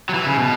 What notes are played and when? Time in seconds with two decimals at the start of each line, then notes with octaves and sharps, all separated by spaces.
0.09 F#3
0.14 E3
0.26 C#3
0.39 B2